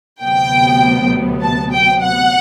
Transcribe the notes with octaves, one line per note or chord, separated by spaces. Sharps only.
D2 C3 F#3 B3 G5
A5
G5
F#5